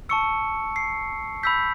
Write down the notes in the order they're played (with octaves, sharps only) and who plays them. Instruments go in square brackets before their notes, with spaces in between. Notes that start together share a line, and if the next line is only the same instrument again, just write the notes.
[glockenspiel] A5 C#6 E6 C#7
C7
B5 E6 G6 B6